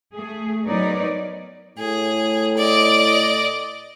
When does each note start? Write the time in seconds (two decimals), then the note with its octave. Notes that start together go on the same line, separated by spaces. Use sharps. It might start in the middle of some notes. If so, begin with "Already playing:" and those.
0.15 A3 G#4
0.64 F#3 B3 D#4 A#4 C#5 D5
1.78 A2 G#4
2.57 D5 D#5